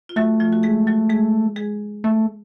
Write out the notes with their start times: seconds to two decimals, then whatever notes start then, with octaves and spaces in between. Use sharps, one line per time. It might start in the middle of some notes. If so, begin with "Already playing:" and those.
0.09 F4
0.16 F#3 A3 F#4
0.40 F3 F4
0.52 F#4
0.63 G#3 G#4
0.87 F#3 F#4
1.10 G#3 G#4
1.56 G#3 G#4
2.04 A3